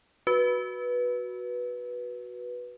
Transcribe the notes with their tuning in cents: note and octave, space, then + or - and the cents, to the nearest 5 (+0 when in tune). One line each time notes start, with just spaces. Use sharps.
F#4 +0 B4 -10